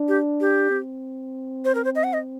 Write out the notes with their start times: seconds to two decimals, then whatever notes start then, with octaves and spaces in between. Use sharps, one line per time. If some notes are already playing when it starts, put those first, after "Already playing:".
Already playing: D4
0.08 G4
0.40 G4
0.71 C4
1.65 C5
1.75 A#4
1.84 C5
1.95 D#5
2.04 F#5
2.13 D#5